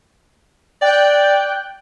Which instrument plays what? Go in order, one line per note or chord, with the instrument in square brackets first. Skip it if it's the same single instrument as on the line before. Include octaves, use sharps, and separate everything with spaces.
[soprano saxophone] D5 [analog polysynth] G5 F#6